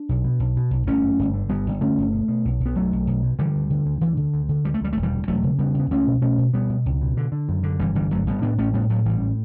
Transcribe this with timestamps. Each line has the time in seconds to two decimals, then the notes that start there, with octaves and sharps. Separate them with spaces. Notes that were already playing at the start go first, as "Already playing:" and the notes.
Already playing: D4
0.09 B1
0.24 B2
0.40 B1
0.56 B2
0.71 B1
0.87 G1 A3 C#4
1.03 F#2
1.19 G1
1.34 D3
1.49 G1 G3 B3
1.66 G1
1.81 D3 A3 C#4
1.97 G1
2.13 B2
2.28 B2
2.45 B1
2.60 B1
2.65 B3
2.75 B1 F#3 A3
2.92 B1
3.07 B1
3.23 B2
3.39 D3 E3 G3
3.55 D2
3.70 D3
3.86 D2
4.01 D2 E3
4.17 D3
4.34 D2
4.49 D3
4.64 D2 G3
4.74 A3
4.81 D2 G3
4.93 E1 A3
5.03 E3 G3
5.12 D2
5.28 E1 F#3 A3
5.43 C#3
5.59 C#3 G3 B3
5.74 C#3
5.80 B3
5.90 C#2 A3 C#4
6.07 B2
6.22 B2 A3 C#4
6.38 B2
6.53 B2 G3 B3
6.69 B2
6.86 C#2
7.01 B2
7.17 D3
7.32 D3
7.49 F#2
7.63 D3
7.80 G1 E3 G3
7.95 D3 E3 G3
8.11 G1 F#3 A3
8.26 G1 G3 B3
8.42 A2 B3 D4
8.58 A1 A3 C#4
8.74 A2 G3 B3
8.89 A2 F#3 A3
9.05 A1 E3 G3
9.22 A2